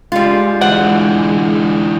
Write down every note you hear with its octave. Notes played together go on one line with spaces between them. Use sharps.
G3 G#3 F4
D3 E3 F#5